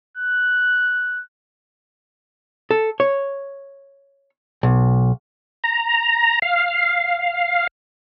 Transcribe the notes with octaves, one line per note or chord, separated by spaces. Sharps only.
F#6
A4
C#5
B1
A#5
F5